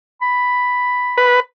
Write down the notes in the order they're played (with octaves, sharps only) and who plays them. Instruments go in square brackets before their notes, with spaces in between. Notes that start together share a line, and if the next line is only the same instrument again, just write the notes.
[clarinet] B5
[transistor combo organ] B4